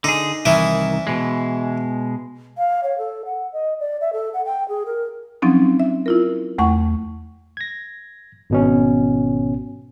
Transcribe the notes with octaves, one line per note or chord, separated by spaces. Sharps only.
D3 D#4 G#4
C2 D#3 E3 E4
B2 G#3
F5
C#5
A4
F#5
D#5
D5
E5
A4
F#5
G5
G#4
A#4
F3 F#3 C4 C#4 D#4
E5
E4 F4 A#4
E2 A3 F#5 C#6
G#6 A#6
G#1 B2 C#4